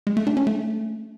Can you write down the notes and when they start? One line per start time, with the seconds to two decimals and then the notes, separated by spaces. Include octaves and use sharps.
0.07 G#3
0.17 A3
0.27 D4
0.37 C#4
0.47 A3